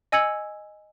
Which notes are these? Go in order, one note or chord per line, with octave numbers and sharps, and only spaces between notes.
D#5 G#5 E6 G#6 C#7 F#7